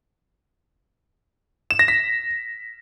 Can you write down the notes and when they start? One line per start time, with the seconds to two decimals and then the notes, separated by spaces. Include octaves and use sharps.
1.71 E7
1.79 A#6
1.88 B6